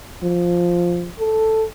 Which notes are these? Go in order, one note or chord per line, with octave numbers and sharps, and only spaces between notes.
F3
A4